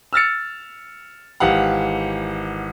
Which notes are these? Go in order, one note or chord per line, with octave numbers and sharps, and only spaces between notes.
E6 F6 A6 C#7
G#1 E3 G4 F5 F#5